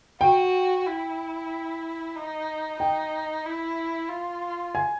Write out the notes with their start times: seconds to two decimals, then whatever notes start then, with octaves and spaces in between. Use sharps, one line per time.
0.21 F#4 G5
0.87 E4
2.16 D#4
2.80 D#4 G5
3.45 E4
4.09 F4
4.75 G#5